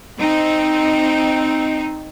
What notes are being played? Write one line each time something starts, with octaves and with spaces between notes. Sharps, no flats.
C4 D#4